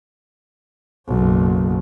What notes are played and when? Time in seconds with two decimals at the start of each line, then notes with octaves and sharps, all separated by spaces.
1.08 F#1 B1